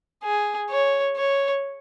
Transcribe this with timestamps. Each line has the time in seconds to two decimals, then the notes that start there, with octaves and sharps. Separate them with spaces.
0.24 G#4
0.70 C#5
1.17 C#5